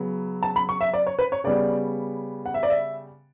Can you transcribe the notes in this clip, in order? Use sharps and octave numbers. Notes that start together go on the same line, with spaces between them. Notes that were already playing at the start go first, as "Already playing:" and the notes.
Already playing: C#3 F#3 B3
A5
B5
C#6
E5
D5
C#5
B4
C#5
C#3 G3 B3 D5
F#5
E5
D5
E5